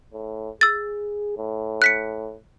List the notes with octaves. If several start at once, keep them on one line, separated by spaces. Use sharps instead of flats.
A2
G#4 E6 A6
A2
F#6 B6 C#7